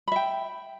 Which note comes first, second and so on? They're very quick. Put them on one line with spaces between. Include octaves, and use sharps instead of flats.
B5 E5 G5